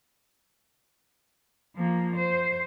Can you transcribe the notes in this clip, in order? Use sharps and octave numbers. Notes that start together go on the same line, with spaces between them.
F3 A#3
C5